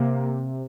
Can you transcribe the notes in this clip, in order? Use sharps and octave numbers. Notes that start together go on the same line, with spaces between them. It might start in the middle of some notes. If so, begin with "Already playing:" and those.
Already playing: C3 A#3